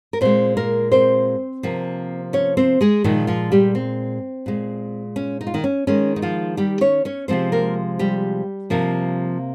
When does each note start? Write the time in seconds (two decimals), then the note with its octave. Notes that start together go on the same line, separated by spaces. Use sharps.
0.13 A#4
0.21 A#2 G#3 C4 C5
0.57 A#3 A#4
0.92 C4 C5
1.63 C3 F3 A#3
2.33 C#4 C#5
2.57 C4 C5
2.81 G#3 G#4
3.04 A#2 D#3 F3 G#3 D#4
3.27 F3 F4
3.52 G3 G4
3.75 C4
4.46 A#2 G#3
5.16 C#4
5.41 D#4
5.47 F4
5.54 D#3 D#4
5.64 C#4
5.87 D#3 G#3 C#4
6.16 D#4
6.22 F3 F4
6.57 G3 G4
6.81 C#4 C#5
7.05 C#4 C#5
7.28 C3 F3 G#3 C4 C5
7.52 A#3 A#4
7.99 G3 G4
8.70 C3 F3 A#3